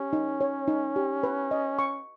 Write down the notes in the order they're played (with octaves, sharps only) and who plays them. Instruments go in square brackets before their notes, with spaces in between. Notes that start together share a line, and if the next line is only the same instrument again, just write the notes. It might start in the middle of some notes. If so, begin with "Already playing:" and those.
Already playing: [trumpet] C#4 [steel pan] G4
[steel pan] D#4
C#5
D#4
G4
B4
D#5
C#6